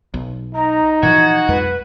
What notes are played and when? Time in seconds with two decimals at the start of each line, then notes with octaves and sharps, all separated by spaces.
0.14 B1
0.55 D#4 A#5
1.03 A#2 E3 F3 F#4 G#6
1.48 B1 F2 G#3 B4